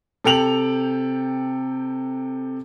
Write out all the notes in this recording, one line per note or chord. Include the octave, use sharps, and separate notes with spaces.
C3 A4 G5 F7 F#7